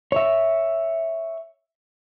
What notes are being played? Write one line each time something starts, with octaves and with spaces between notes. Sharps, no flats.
C#5 E5